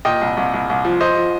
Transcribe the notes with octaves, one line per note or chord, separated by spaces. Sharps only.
A#2 D#5 G5
C2
C2
C2
C2
F3
F3 C5 D#5
F3